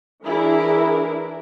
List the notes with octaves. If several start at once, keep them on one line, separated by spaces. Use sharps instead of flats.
E3 D4 E4 G#4 A#4